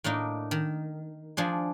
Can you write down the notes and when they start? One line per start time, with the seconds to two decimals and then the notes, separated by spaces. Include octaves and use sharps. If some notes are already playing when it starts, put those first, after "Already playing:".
0.04 A2 A#3 D4 D#4
0.51 D#3
1.37 F3 D4 G#4